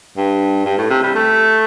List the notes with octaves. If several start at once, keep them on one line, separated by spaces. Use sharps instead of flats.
G2
G2
A2
C3
G3
A3